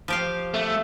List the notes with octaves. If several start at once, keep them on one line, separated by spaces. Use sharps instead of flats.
F3 G4 F5
A3